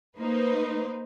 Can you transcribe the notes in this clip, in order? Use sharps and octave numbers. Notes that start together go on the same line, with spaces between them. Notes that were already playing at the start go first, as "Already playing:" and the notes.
A#3 D#4 B4 C5